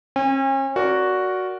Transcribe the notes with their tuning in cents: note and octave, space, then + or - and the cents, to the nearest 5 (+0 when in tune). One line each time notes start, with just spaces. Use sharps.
C#4 -40 G#5 -45
F#4 +0 A#4 +0 D5 -15